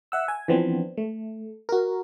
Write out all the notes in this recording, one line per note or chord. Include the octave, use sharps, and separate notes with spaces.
E5 F#5 E6
G#5
E3 F3 B3 C4 D4
A3
F#4 A#4